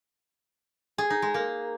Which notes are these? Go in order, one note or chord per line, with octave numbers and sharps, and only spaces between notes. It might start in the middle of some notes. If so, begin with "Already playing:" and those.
G#4
D#4
G#3
A#3